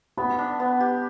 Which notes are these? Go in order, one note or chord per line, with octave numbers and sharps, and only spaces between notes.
B3 B5
D4
B3
G4